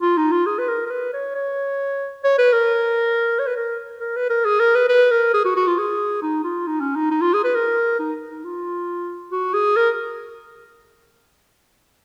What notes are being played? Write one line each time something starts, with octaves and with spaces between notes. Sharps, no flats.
F4
D#4
F4
G#4
B4
A#4
A#4
B4
C#5
C#5
C#5
B4
A#4
C#5
B4
A#4
A#4
B4
A#4
G#4
A#4
B4
B4
A#4
G#4
F#4
F#4
F4
G#4
D#4
F4
D#4
C#4
D#4
D#4
F4
G#4
B4
A#4
D#4
D#4
F4
F#4
G#4
A#4